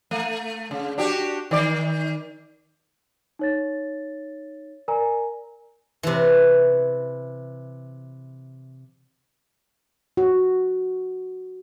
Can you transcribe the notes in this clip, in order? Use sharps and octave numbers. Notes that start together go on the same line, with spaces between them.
A3
C#3
D4 F#4 G4
D#3 D5
D#4 C#5 A6
A#4 D5 G#5 A#5
C3 E3
F#4